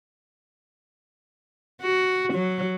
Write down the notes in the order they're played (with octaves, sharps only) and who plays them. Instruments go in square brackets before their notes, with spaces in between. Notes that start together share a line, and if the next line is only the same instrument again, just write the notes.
[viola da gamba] F#4
F#3